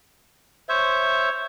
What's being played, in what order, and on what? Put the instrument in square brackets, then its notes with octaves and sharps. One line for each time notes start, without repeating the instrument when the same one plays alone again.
[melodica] C5 E5 [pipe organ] C#5